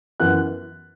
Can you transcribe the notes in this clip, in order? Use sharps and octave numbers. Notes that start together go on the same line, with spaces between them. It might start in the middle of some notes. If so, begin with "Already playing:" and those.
F#2 E3 B3 F#6